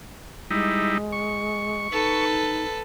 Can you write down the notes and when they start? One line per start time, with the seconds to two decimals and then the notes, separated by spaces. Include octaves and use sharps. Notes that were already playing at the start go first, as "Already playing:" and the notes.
0.50 G3 G#3 D#4 E4
1.12 C#6
1.92 D#4 A4 B4